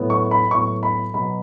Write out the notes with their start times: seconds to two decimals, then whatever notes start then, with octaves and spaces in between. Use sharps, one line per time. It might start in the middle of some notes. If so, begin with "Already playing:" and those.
Already playing: A2 F#3 B3
0.10 C#6
0.31 B5
0.51 A2 F#3 B3 C#6
0.83 B5
1.14 B2 F#3 B3 B5